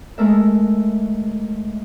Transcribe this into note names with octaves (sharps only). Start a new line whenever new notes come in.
G#3 A3 A#4 E5